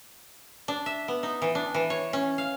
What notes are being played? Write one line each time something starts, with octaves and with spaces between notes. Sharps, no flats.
D4
E5
B3
D#4
E3
D4
E3
C#5
C#4
F5